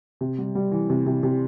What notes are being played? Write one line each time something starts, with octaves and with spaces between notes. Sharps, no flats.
C3
G3
G3
E3
C3
C3
C3